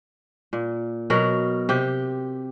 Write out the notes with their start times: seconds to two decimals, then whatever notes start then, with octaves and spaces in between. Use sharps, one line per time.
0.53 A#2
1.10 B2 F#3 A#4
1.69 C3 G4